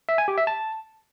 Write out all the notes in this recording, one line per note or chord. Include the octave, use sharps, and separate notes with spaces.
E5
G#5
G4
E5
A5